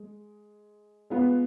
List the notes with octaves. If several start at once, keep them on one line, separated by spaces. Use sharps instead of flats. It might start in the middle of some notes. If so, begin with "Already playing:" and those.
Already playing: G#3
G#3 B3 F4 B4